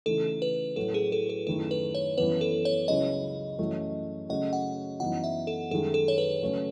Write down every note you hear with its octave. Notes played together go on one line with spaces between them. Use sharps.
C#3 E3 A3 D#4 A4
B4
A2 F#3 C#4 F#4 A4
G#4
A4
A4
F#2 D#3 A3 E4 A4
B4
C#5
F#2 E3 B3 B4
A4
C#5
C#2 C#3 F#3 C#4 E4 D#5
F#2 E3 A3 C#4 F#4
C#3 F#3 A3 C#4 F#4 D#5
F#5
F#2 E3 B3 D#4 F#4 F#5
E5
A4
F#2 D#3 G#3 A4
A4
C#5
B4
C#3 F#3 A3 C#4